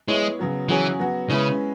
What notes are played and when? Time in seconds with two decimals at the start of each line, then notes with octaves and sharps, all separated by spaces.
0.08 G#3 B3 E4 C#5
0.39 C#3 F#3 B3 F#4
0.69 E3 F#3 C#4 G#4 C#5
0.99 F#3 B3 F#4
1.29 C#3 G#3 C#4 E4 B4